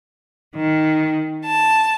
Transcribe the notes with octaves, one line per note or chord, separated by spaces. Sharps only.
D#3
A5